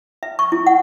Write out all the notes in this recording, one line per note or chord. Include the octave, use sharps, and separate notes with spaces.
E5
C#6
E4
F#5